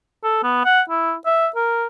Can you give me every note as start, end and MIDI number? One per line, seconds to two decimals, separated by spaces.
0.24 0.42 69
0.43 0.61 59
0.65 0.81 78
0.90 1.15 64
1.26 1.48 76
1.56 1.87 70